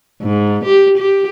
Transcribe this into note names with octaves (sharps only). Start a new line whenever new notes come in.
G#2
G4
G4